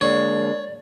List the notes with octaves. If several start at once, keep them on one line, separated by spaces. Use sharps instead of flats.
D3 G#3 A#3 C#5 D5